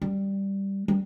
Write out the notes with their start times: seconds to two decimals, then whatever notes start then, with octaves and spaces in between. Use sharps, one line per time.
0.02 G3
0.88 G3